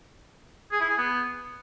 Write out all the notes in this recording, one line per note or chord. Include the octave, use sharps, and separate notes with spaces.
G#4
E4
G#4
B3